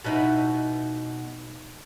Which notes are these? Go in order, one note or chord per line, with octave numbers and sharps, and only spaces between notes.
B2 D#4 E4